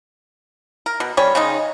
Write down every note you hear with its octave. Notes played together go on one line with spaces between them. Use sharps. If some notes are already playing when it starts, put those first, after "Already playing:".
A#4
B2
G3 C#4 C#5
C#3 G#3 D#4